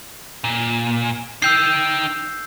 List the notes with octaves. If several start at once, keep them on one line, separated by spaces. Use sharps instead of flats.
A#2
D#4 G5 E6 G6 C7